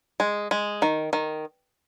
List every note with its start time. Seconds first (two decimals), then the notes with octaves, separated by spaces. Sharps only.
0.20 G#3
0.51 G#3
0.82 D#3
1.13 D#3